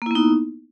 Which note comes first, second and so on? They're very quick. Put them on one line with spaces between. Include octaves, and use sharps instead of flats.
A#3 E4 B3 D#4